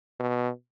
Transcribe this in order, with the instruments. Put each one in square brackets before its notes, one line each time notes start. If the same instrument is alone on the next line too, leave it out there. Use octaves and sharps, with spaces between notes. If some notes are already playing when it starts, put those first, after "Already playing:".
[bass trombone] B2